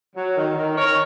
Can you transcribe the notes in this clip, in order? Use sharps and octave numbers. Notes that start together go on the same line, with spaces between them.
F#3
D#3
D#3
D#3 A#4 C#5